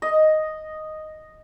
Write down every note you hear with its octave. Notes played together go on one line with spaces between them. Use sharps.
D#5